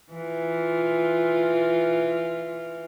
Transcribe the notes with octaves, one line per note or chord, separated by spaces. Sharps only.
E3 F4